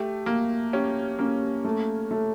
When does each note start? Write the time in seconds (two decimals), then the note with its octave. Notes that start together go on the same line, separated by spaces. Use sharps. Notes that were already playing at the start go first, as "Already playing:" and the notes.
Already playing: A3 G4
0.26 A#3 G4
0.73 C#4 G4
1.19 A#3 C#4
1.65 A3
2.11 A3